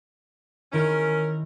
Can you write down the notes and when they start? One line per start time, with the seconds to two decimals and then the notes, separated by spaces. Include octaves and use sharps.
0.73 D#3 C#4 E4 A#4